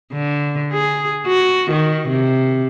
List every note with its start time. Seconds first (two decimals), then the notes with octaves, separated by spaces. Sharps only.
0.12 D3
0.73 G#4
1.27 F#4
1.71 D#3
2.09 C3